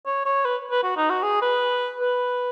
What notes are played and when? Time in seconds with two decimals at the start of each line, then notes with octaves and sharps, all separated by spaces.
0.06 C#5
0.25 C#5
0.45 B4
0.71 B4
0.83 F#4
0.96 D#4
1.10 F#4
1.23 G#4
1.42 B4
2.00 B4